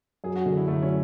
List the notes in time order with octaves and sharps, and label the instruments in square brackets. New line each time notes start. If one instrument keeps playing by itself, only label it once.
[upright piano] F#2 [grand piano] G#4
[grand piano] F#4
[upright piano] D3
[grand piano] E4
[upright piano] F#2 [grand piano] A3
[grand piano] C#4